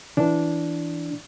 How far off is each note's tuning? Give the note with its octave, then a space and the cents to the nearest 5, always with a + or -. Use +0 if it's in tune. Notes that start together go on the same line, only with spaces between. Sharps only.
E3 +0 D4 -10